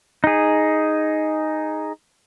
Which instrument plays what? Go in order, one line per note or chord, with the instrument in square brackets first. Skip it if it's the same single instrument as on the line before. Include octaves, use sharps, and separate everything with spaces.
[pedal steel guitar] D#4 G#4